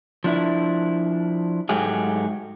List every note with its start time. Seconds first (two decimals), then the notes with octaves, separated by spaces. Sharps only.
0.24 F3 D4 E4
1.69 G#2 F#3 A3 G4 G#4